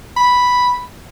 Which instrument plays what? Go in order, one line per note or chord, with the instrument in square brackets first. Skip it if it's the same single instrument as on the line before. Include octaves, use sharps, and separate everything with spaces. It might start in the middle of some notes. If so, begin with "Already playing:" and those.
[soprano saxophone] B5